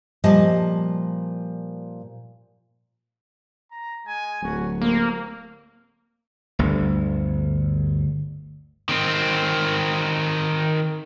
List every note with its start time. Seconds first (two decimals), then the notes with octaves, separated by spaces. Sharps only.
0.24 A#2 F3 G3 D#5 G#5 A5
3.72 A#5
4.05 G#3 G#5
4.42 D1 C#4 F#4
4.82 G3 A#3 C4
6.59 G1 D2
8.89 D#3 C4